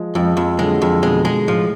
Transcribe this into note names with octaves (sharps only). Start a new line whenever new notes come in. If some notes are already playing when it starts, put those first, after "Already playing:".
Already playing: F3 G#3
F2 F3 G#3
F2
D3 F#3 G#3
F2
B2 D3 G#3
G#3
A2 F3